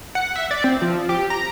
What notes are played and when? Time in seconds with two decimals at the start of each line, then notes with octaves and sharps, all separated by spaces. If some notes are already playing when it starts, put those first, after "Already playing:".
0.15 F#5
0.36 E5
0.51 D5
0.64 C4
0.82 F3
1.09 G4
1.30 A#5